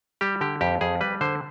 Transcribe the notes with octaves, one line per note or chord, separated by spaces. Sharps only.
G3 G4
D3 G4
F2 G4
F2 G#4
G3 B4
D3 C5